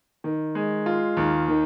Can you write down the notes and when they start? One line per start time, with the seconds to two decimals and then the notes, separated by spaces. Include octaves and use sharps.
0.24 D#3
0.55 G#3
0.86 F4
1.17 D#2
1.48 D#3